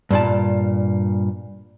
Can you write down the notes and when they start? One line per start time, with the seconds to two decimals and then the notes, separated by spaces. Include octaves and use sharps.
0.11 G2 A#2 A5